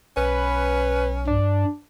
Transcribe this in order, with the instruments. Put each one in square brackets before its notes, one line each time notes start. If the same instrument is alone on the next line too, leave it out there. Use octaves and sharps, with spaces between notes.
[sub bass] B1 [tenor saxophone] C#4 [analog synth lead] B4
[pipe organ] G2 [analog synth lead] D4